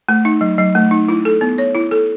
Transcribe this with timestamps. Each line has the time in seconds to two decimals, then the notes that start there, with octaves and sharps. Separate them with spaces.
0.09 A3
0.25 D#4
0.41 F#3
0.58 F#3
0.75 A3
0.91 D#4
1.08 E4
1.25 A4
1.41 B3
1.58 C#5
1.75 E4
1.91 A4